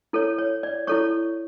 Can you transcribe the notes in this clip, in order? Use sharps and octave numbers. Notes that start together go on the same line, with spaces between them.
E4 A4 C#5
C#5
D5
E4 A4 C#5 C#6